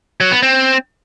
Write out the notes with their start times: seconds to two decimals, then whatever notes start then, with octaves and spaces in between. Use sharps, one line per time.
0.21 F#3
0.32 B3
0.43 C4